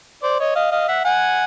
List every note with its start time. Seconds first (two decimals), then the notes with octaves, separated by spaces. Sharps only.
0.23 C5 D5
0.40 C#5 D#5
0.55 D#5 F5
0.71 D#5 F5
0.88 E5 F#5
1.05 F#5 G#5